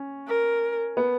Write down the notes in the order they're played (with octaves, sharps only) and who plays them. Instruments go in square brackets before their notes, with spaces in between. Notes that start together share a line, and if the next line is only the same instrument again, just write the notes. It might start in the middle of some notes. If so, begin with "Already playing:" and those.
Already playing: [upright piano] C#4
[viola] A#4
[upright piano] B3